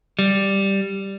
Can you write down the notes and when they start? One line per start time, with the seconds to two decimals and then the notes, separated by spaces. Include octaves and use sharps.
0.19 G3